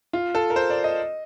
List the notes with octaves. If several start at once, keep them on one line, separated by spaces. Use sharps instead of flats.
F4
A4
A#4
C5
D5
D#5